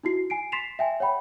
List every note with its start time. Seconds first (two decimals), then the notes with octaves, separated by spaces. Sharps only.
0.03 D#4 E4 F#4 C7
0.30 G#5 C7 D7
0.52 C6 A6 B6 C7 E7 F7
0.79 E5 G5 G#5
1.00 C#5 F#5 G5 B5